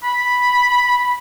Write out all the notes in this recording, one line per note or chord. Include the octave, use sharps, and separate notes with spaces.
B5